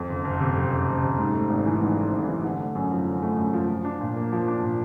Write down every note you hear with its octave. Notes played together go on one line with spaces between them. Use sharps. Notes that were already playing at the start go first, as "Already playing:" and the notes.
Already playing: F2
F#1
F#1
C3
F2
F#1
F#1
C3
G#2
A3
G#1
E3
G#2
A3
G#1
E3
D3
A3
F#2
F3
D3
A3
F#2
F3
F3
D4
A#2
A#3
F3
D4
A#2